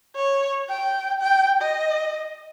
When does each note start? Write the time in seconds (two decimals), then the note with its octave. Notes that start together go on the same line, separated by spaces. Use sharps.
0.15 C#5
0.69 G5
1.21 G5
1.61 D#5